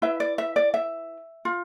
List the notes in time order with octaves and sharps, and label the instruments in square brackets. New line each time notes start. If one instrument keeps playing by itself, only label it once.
[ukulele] E4 B4 E5
D5
E5
D5
E5
F4